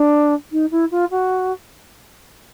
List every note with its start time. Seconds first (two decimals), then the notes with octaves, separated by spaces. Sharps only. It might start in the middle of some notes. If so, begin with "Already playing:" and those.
Already playing: D4
0.52 D#4
0.71 E4
0.91 F4
1.11 F#4